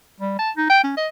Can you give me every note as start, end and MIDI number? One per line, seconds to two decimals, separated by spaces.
0.20 0.34 55
0.39 0.50 81
0.57 0.68 63
0.70 0.81 79
0.84 0.93 61
0.97 1.08 75